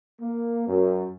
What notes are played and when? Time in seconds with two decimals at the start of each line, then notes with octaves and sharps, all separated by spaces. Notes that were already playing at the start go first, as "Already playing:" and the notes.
0.21 A#3
0.66 F#2